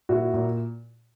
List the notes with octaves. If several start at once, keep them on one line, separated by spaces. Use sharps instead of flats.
A#2 E4 F#4
A#2